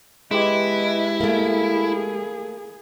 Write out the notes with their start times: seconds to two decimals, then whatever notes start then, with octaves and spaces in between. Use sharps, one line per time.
0.31 G#3 E4 G4 B4 D#5
1.21 A3 A#3 G#4